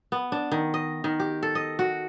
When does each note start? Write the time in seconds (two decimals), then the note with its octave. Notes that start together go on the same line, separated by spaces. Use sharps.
0.12 B3
0.32 D4
0.52 D#3
0.74 D#5
1.04 D#3
1.20 G4
1.43 A4
1.55 D#5
1.79 F#4